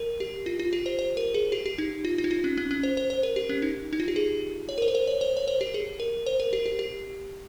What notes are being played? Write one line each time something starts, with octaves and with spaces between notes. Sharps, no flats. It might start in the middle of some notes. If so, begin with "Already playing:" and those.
Already playing: A#4
G4
F4
F4
G4
C5
C5
A#4
G#4
G4
G4
D#4
F4
F4
D#4
F4
C#4
C#4
C#4
C5
C5
C5
A#4
G4
C#4
D#4
D#4
F4
G4
G#4
C#5
A#4
C5
A#4
C5
C#5
C5
C#5
C5
G4
G#4
A#4
C5
A#4
G4
G4
G4